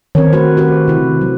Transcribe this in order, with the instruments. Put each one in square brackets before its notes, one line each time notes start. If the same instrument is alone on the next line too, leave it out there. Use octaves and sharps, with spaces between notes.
[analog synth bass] D#3 [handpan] C4 A#4 C#5
[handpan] A3 F#4 B4
F#4 G4 B4
C3 E4
F#3